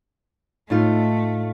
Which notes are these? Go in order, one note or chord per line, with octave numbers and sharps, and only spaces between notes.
A2 A3 D#4 F4